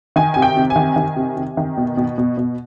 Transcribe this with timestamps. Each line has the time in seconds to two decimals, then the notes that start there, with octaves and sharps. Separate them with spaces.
0.16 D#3 G#5
0.34 C3 G#5
0.42 G5
0.57 C3
0.70 G#5
0.76 D#3
0.96 D#3
1.16 C3
1.37 C3
1.57 D#3
1.77 B2
1.97 B2
2.18 B2
2.37 B2